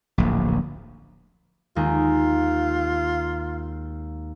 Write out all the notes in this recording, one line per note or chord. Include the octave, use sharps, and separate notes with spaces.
D1 A#1
D#2 G#3 F4